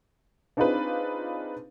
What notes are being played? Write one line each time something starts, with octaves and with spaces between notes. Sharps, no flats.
C4 D4 D#4 F4 G#4 B4